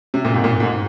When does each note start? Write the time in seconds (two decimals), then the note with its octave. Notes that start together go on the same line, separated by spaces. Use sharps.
0.14 C3
0.25 A#2
0.34 G#2
0.44 A#2
0.60 G#2